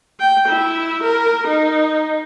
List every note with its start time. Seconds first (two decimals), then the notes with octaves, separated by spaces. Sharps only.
0.20 G5
0.48 E4
1.03 A#4
1.47 D#4